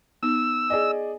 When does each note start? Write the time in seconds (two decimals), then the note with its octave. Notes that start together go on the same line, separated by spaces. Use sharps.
0.23 B3 D#4 E6
0.70 G#4 D5 D#5 G#5